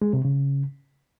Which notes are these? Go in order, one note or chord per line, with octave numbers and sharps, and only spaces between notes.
G#3
C3
C#3